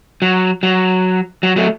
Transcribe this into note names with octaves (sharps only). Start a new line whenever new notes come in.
F#3
F#3
F#3
F#3 A3